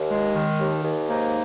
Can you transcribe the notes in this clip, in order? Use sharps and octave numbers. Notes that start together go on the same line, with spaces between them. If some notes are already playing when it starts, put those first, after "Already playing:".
Already playing: D#2
G#3
D#3
D#2
D#2
G#2 A#3 D#4